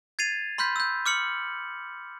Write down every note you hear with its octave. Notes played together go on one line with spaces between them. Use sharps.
G#6 A6 C7 D#7 F7
B5 C6 F6 G6 B6
E6 G6
D6 F6 C#7 F#7